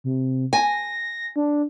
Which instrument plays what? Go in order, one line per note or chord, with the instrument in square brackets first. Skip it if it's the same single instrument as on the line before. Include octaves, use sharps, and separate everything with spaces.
[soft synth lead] C3
[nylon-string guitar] G#5 [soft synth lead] A#6
[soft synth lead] D4